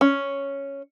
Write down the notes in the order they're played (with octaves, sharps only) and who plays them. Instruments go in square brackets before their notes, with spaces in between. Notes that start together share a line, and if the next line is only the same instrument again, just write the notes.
[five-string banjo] C#4